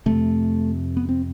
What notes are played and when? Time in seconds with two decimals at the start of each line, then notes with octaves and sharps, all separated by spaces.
0.06 F2 C3 A3
0.97 B3
1.09 C4